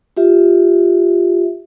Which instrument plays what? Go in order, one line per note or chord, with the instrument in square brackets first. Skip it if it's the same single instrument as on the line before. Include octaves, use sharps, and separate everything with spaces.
[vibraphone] F4 G4 E5